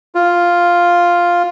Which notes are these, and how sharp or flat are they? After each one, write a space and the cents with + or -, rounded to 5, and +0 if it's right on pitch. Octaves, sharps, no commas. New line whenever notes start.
F4 +0